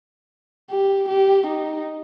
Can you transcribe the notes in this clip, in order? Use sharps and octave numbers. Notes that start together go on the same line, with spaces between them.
G4
G4
D#4